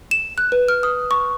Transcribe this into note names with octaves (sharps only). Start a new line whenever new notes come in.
E7
F#6
B4
F6
D#6
C#6